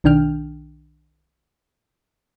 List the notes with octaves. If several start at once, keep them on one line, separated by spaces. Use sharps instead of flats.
B1 D#3 D4 G5 F6